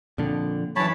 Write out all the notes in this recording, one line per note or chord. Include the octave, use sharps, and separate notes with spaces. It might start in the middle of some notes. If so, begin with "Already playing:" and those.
F2 A#2 D3
F#2 E3 C#5 A5 B5